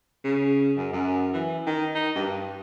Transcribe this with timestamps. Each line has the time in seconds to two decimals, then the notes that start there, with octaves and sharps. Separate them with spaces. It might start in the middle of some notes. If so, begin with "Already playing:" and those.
0.24 C#3
0.77 F#2
0.93 F#2
1.33 E3
1.66 D#3
1.95 D#4
2.15 G2